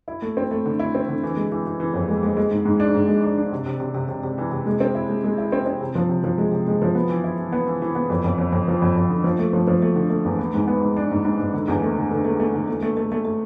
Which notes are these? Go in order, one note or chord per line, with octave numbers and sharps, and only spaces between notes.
E4
A3
C4
A3
D3
E4
C4
D3
E3
G#3
E3
E3
E3
F2
G#3
G#3
G#3
G#2
G#2
D4
G#2
G#3
D4
D4
C3
C3
C3
C3
C3
C3
E3
C3
G#3
C4
E4
G#3
G#3
E4
C4
C4
C3
F3
C3
F3
G#3
C3
G#3
F3
B3
E3
E4
E3
B3
E3
E3
B3
F2
F2
F2
F2
F3
F2
F2
D3
F3
A3
F3
F3
A3
D3
A3
E2
B3
G#2
B3
G#2
D4
G#2
G#2
G#2
D3
E2
A3
D3
D3
A3
A3
D3
A3
A3
A3
A3
A3